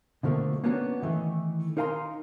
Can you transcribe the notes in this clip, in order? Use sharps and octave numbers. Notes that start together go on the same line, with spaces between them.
B2 D3 F3 A3 A#3
A#3 B3 C#4 D4 F#4
D#3 E3 A3
D#4 A#4 F5 G#5 A#5 C6